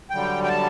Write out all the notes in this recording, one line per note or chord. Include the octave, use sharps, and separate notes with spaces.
F#2 D3 G3 G5
G5
A5